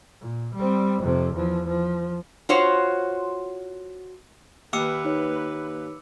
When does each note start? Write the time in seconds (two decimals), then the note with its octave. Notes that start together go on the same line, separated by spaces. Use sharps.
0.21 A#2
0.55 G3 C4
1.02 F2 C3
1.35 E2 F3
1.67 F3
2.49 F4 F#4 C5 C#5
4.73 D#2 A#3 B4 D6 E6 C#7
5.05 D#4 C#5